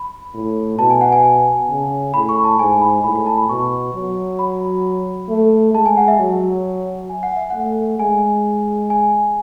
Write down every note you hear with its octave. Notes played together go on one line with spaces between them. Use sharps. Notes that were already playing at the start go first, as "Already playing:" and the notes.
Already playing: B5
A2
B2 A5
G#5
F#5
G#5
C#3
A2 B5
C#6
A5
G#2 G#5
B5
A2 B5
B5
A5
B5
B2 C#6
F#3
B5
A3
G#3 A5
G#5
F#5
E5
F#3
G#5
F#5
E5
A3 F#5
G#3 G#5
G#5